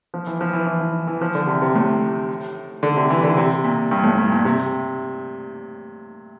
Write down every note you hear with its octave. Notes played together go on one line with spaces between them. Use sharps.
F3
E3
F3
E3
E3
E3
E3
F3
D3
C3
C3
A2
D3
C3
E3
D3
C3
A#2
G2
A2
G2
A#2
C3